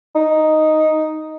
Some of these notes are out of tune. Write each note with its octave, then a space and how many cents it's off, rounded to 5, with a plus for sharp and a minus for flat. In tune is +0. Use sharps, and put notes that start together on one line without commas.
D#4 +0